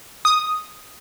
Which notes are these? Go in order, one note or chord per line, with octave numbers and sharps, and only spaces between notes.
D#6